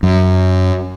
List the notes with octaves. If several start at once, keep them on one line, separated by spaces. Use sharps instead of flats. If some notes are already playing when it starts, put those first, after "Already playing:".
F#2